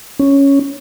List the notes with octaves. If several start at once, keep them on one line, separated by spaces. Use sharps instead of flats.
C#4